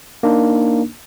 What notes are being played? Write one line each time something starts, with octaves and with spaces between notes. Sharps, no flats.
A#3 D4 D#4